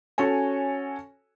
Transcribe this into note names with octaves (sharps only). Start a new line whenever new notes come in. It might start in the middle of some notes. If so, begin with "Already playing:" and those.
C#4 F#4 A4 C#5 G#5